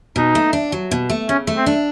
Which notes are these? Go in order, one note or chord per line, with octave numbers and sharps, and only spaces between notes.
B2 D#4
A3
D4
F#3
B2
A3
C#3 C#4
A3
C4
D4